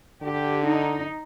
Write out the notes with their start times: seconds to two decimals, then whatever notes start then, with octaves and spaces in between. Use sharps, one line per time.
0.23 D3 G4
0.65 D#4